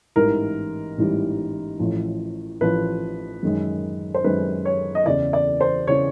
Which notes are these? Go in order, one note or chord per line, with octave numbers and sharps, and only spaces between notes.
A1 G#2 E3 G3 A#4
A1 G#2 E3 G3
A1 A2 F3
A1 A2 F3 B4
F#2 D#3 G#3
C5
F#2 D#3 G#3 B4
C#5
D#5
E2 C#3 E3 D5
D5
C5
C#3 E3 C#5